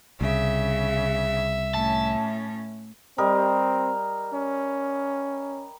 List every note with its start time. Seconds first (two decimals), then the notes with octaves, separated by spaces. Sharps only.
0.21 C2 C#3 E5
1.74 A2 C#4 A5
3.18 G3 C4 A#4 D#5
4.34 C#4